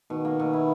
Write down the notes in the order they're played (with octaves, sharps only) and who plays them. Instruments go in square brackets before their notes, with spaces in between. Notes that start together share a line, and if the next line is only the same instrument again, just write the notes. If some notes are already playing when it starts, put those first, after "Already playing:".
[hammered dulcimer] B2 [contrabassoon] D#3
[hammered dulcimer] A#3
B2
E4